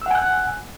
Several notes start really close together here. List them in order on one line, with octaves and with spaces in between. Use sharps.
E6 F#5 G#5 F#6